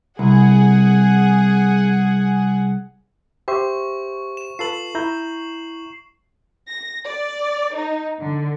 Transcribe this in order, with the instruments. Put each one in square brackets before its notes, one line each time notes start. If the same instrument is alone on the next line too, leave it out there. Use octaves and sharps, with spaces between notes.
[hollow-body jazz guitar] C2 [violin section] G#4 F#5
[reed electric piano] G4 C5 E5 [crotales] C#6
[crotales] E7
[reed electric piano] F4 A4 B4 [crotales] C7 F#7
[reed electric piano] E4 A#5 G6
[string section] A#6
D5
D#4
D3